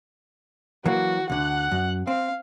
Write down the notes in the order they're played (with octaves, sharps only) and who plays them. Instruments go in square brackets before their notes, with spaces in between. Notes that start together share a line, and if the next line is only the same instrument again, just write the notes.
[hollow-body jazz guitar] E3 F#3 A#3 [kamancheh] F#4
[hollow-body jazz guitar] D2 D3 [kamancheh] F#5 F#6
[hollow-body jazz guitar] F#2
[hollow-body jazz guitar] C4 [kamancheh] F5